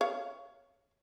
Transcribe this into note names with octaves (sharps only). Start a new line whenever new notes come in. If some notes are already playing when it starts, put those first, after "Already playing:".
C#5 F5